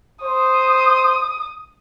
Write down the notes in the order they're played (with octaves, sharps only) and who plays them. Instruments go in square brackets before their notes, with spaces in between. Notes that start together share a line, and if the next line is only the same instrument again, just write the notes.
[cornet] C5 [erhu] D#6